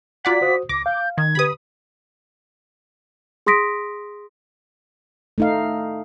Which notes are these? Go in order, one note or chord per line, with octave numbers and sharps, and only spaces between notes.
F4 F#4 D5 F#5 A#5 G#6 B6
F#4 C5 D#6
C#2 D6 A#6
F5 G6
D#3 G#6
D3 G4 B4 B5 D#6
G#4 C6 D#6 A#6 B6 D7
A3 D#4 F5